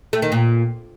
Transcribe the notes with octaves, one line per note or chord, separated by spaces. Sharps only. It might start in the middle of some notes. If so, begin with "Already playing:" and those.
A3
D#3
A#2